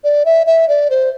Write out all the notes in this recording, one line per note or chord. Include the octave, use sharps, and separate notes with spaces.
D5
E5
E5
D5
C5